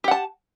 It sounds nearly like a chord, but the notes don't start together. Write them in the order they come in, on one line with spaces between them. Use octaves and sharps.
G4 F#5 A5